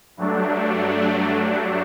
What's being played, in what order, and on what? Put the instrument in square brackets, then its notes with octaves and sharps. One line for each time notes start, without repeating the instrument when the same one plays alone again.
[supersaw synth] G2 F#3 A3 D4